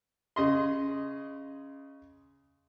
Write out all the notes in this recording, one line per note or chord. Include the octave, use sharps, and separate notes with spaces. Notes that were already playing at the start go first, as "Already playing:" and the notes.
C#3 D#5 C6